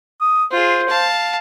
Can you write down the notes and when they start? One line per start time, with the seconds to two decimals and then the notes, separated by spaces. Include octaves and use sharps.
0.21 D#6
0.51 F4 G#4 C5
0.88 F5 A5